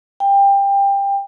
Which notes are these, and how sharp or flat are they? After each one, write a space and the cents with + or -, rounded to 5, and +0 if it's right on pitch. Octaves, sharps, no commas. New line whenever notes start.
G5 +20